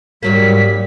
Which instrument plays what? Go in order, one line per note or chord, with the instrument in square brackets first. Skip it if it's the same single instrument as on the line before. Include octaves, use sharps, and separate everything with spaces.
[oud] G#2 F#3 A#3 [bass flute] G3 [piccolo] B6